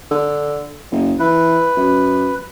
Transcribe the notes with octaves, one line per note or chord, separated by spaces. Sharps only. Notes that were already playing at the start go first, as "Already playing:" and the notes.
D3
F#1
E3 B4
F#2